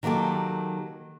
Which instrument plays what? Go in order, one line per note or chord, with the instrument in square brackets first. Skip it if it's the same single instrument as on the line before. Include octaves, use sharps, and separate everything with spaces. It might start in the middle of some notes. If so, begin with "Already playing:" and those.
[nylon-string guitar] D#3 F#3 A#3 G4 A4